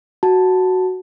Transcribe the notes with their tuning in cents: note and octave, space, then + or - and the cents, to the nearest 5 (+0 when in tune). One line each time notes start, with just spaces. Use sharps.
F#4 +0 A5 +0